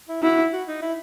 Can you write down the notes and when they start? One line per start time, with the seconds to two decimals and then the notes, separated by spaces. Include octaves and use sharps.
0.08 E4
0.22 E4 F#4
0.52 F#4
0.68 D#4
0.82 E4